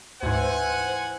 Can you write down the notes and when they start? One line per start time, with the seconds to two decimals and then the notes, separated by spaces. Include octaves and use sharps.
0.23 D2 G#2 E3 C4 C5 F#5 G#5